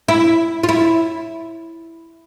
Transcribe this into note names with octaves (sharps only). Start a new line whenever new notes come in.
E4
F4
E4